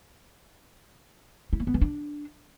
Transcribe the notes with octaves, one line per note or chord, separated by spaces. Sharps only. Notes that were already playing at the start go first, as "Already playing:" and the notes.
E4
A#3
B3
E3
D4